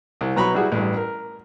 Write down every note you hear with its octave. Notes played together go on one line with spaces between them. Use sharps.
C2
B1 F#3 A#5 B5 C#6
G3 E4 F#4 G#4
A1 G2
A#4